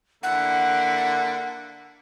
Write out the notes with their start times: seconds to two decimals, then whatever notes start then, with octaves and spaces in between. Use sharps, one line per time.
0.23 D3 A#3 E4 F#5